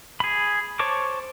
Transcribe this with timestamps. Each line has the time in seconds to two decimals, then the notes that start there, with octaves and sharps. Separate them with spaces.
0.20 G#4 B5
0.79 C5 C#5 A5 C#6 D6